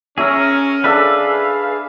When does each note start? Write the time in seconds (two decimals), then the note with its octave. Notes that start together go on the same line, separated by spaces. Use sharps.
0.18 C#4 G#4 A#4 C#5 E5 A#5
0.84 D4 G#4 A4 B4 E5 F5